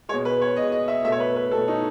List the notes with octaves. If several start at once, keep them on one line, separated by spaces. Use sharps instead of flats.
B2 G#3 C#5
B4
C#5
B2 G#3 D#5
D#5
E5
B2 A3 E5
C#5
B4
B4
B2 A3 A4
D#4